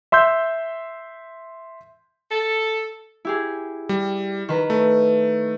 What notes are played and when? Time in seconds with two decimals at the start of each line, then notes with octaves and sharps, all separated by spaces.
0.12 E5 C6 E6 G6
2.31 A4
3.25 E4 G4 G#4
3.89 G3
4.49 D#3 B4 A#5
4.70 A3